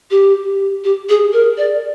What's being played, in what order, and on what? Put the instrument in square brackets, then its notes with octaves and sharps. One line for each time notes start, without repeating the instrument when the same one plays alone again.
[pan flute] G4
G4
G#4
A#4
D5